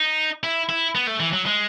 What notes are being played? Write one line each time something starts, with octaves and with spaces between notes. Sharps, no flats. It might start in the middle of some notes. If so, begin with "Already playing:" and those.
Already playing: D#4
E4
E4
B3
A3
E3
F#3
G#3